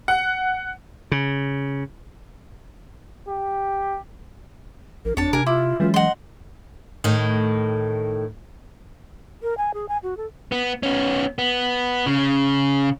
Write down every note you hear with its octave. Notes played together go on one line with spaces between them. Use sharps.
F#5
C#3
G4
A#1 A#4
G1 F2 D4 C#5 A5
C3 A#4 G#5
E4 F4 C6 D6 E6
E3 F#3 G#3 C#4 F4
D#5 F#5 C6
A2 D#3
A#4
G#5
G#4
G#5
F#4
A4
B3
B3 C#4
B3
C#3